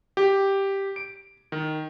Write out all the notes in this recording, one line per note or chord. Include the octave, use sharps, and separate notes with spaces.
G4
D7
D#3